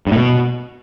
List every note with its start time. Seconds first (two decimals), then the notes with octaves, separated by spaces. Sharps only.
0.07 G2
0.12 A2
0.17 B2